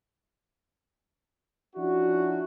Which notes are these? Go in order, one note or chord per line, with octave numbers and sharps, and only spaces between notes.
F3 C#4 D4 E4 F#4